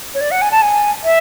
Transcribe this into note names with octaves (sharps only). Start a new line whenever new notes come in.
C#5
D5
F#5
G#5
A5
G#5
E5